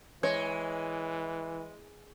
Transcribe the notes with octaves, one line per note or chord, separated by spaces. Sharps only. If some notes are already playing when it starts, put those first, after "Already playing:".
E3 G#3 C#5